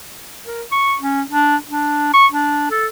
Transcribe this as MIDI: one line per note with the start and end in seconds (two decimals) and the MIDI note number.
0.45 0.63 70
0.72 0.96 85
1.01 1.22 61
1.30 1.56 62
1.68 2.12 62
2.14 2.26 85
2.32 2.68 62
2.71 2.87 69